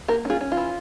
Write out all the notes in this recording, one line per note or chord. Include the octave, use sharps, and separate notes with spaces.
A#3 G4 A#4
C#4 F4 G#4
C#4
F4
E3